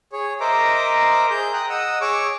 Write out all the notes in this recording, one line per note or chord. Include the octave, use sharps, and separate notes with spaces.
G#4 C#5
A#4 C5 D#5 E5 A#5 D6
G#4 G6
G5 A#5 D#6 F#6
D#5 F#5 D#6 E6
G#4 C#5 C#6 D6 E6